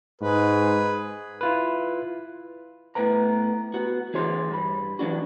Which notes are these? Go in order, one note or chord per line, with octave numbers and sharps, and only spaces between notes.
G#2 G#4 B4
E4 F4 B4
A2 B3 B4 A#5
B3 F#4
E3 G#4 C#5 C6
G2 B5
E3 F#3 D4 F#4